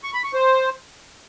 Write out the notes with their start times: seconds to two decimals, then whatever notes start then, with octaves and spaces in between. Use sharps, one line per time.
0.04 C#6
0.14 B5
0.24 C#6
0.34 C5